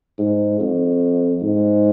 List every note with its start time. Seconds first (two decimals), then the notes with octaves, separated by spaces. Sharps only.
0.18 G#2
0.60 F2
1.42 G#2